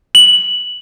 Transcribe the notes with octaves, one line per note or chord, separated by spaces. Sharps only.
F#7